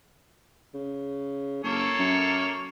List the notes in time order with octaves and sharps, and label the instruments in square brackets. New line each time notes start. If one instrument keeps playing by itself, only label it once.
[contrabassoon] C#3
[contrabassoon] F#1 [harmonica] A#3 A4 C#5
[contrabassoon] F#2